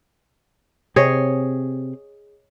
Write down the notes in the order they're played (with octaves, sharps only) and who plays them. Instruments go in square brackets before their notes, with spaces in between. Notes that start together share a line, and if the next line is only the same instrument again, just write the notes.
[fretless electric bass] C3 C4 [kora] G#4 C#5 D#5